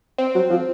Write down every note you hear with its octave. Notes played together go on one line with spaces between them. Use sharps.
C4
F#3
F3